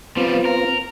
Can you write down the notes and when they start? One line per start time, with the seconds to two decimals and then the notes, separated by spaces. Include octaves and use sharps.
0.17 F3 G3 B3 C4 F4
0.45 A#4